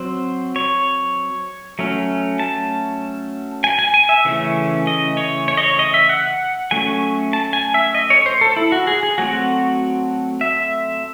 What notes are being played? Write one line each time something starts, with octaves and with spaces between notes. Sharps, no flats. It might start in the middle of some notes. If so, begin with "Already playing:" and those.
Already playing: F#3 C4 C5
C#5
F#3 A3 C#4
A5
G#5
G#5
G#5
E5
C#3 E3 A3 C#4
D#5
C#5
C#5
D#5
C#5
D#5
E5
F#5
F#3 A3 C#4 G#5
A5
G#5
E5
D#5
C#5
C5
A4
E4
F#4
G#4
G#4
F#3 A3 C4 F#4
E5